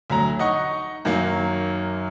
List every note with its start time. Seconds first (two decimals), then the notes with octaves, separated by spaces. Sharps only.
0.10 D2 F#3 A#5
0.39 D#4 D#5 F#5 C#6
1.05 F#2 D#3 F#3 A#3